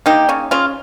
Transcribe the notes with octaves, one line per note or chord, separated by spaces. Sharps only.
A#3 D#4 G4
C#3 C#4
C#3 C#4 F4